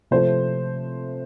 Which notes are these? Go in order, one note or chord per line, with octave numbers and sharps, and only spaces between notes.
C3 F3 A3 C5